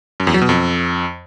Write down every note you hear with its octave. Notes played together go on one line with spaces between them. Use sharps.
F#2
E2
F#3
B2
F2